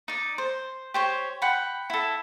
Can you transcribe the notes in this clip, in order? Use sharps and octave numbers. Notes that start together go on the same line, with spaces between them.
D#4 D5
C5
G4 C5 C#5
F#5 G5 B5
E4 A4